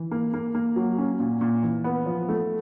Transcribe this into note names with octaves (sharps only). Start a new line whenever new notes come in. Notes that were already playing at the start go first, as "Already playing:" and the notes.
Already playing: E3
A#3
A#3
A#3
F#3
C#4
A#2
A#2
E3
B3
F3
A3